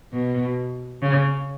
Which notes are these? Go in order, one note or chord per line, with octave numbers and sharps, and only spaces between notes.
B2
C#3